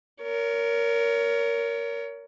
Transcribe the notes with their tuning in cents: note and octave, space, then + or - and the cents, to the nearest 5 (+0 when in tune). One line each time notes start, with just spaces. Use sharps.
A#4 +0 C#5 +30